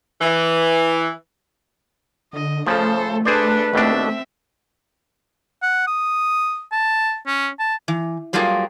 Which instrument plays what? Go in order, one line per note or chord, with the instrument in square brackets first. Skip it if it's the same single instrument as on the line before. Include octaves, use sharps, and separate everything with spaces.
[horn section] E3
[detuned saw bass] D3 [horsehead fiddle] D#5
[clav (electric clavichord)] C#3 F3 [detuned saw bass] A3 [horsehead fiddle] A4 C5
[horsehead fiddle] D4 A4 [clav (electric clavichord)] G#4 C5 D5 [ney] B4
[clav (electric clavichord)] D#2 B2 D4 [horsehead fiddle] C4 E5
[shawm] F#5
D#6
A5
C#4
A5
[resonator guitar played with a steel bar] E3
F#3 G3 A3 A#3 F4 G#4